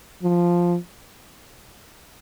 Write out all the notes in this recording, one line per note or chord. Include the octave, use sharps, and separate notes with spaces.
F3